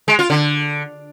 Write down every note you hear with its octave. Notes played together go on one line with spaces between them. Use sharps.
G#3
F4
D3